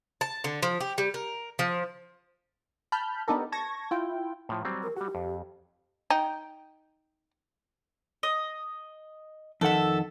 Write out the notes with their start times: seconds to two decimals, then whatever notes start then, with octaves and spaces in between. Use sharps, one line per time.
0.21 A5
0.44 D3
0.63 F3
0.80 G4
0.98 G3
1.14 A#4
1.59 F3
2.92 A5 B5 F6 G6
3.28 B3 D4 D#4 G4 A4 A#4
3.52 A5 C#6 G#6 A#6
3.91 E4 F4 G5
4.49 A2 F3
4.65 F#3 G3 C4
4.83 A#4
4.96 G3 F#4 G4
5.15 F2
6.10 D#4 G5
8.23 D#5
9.61 F2 D#3 A4 E5 F#5